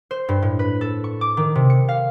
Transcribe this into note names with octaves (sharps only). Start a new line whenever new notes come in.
C5
G2
A2
B4
A4
C#6
D6
D#3
C3
C#7
F5